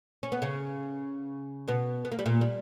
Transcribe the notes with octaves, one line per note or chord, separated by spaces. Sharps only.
C#4
B3
C#3 C#4
B2 B3
B3
A#3
G3
A#2 A#3
G3